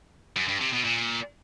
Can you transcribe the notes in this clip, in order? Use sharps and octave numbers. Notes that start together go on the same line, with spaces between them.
F#2
G2
C3
B2
A#2